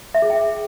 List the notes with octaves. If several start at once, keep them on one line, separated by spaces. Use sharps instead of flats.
E5
G#4
G5